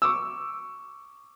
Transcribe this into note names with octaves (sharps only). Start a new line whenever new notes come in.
C#6 D6 E6